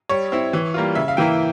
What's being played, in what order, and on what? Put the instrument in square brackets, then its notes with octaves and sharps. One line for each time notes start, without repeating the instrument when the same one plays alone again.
[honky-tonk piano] G3 C#5
C4 E4
E3
G3 A#3 F4
C#3 E5
F5
E3 A#3 E4 G5